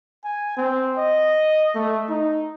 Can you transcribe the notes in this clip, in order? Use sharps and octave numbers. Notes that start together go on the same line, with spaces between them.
G#5
C4
D#5
A3
D#4